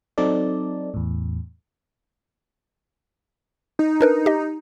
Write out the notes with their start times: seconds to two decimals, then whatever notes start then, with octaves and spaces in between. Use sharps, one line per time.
0.18 F#3 C4 D#4 A4 D5
0.94 E2 A2
3.79 D#4
4.01 D4 A#4 B4
4.26 G4 D#5